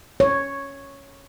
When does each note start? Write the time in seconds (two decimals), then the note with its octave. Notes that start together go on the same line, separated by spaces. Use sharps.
0.20 C#5